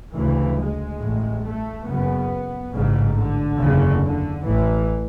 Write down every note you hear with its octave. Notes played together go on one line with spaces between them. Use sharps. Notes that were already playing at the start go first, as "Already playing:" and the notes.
D2 C#3 E3
G#3
A1 A2
A3
F#1 F#2 C#3 B3
A1 G#2 C#3
D3
F#1 E2 C#3
D3
A1 A2 E3